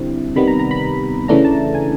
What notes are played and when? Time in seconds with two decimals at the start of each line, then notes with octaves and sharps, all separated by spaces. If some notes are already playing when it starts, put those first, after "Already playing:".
Already playing: D3 G3 C4 E4
0.36 C3 D#3 G3 B3 B5
0.48 A#5
0.59 A#5
0.71 B5
1.28 C#3 E3 A3 D4 A#5
1.45 A5
1.75 G#5